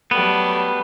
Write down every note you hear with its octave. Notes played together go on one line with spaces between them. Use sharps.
F#3 G3 A3 B3